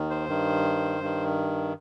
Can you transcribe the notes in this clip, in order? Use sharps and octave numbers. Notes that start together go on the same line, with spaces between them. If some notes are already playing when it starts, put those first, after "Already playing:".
Already playing: D#2 D#3
C5
G2 D#3
G2 D#3